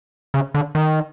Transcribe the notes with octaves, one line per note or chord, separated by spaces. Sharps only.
C#3
D3
D#3